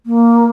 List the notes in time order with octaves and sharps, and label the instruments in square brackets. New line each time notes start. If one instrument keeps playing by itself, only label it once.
[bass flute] A#3